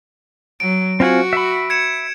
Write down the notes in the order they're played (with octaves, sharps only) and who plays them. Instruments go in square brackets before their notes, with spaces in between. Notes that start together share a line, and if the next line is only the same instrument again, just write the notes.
[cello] F#3 [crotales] D7
[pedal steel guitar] C4 F4 G#5 [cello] F#4
[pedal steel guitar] E5 B5
[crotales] G#6 C#7 E7